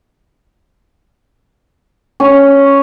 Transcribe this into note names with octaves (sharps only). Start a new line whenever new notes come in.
C#4